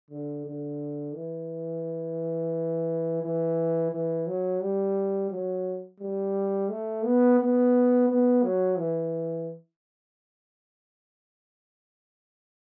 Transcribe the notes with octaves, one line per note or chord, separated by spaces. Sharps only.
D3
D3
E3
E3
E3
F#3
G3
F#3
G3
A3
B3
B3
B3
F#3
E3